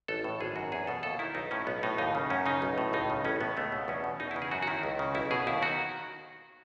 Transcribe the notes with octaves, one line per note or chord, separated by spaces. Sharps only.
A1 A4
A2
G#1 G#4
F#2 F#4
E2 G#4
B2 A4
D#2 A4
D#3 E4
B1 D#4
A2 C#4
B1 B3
A2 D#4
D#2 D#4
C#3
F#2 C#4
C#3 D#4
B1
A2
C#2 D#4
C#3
A1 C#4
A2 B3
C#2 A3
B2
E2 C#4
B2
E2 D#4
E4
C#3
G#4
F#2 F#4
F#4
D#3 E4
C#2
C#3
B1 E4
B2 G#4
D#2 E4
D#3 F#4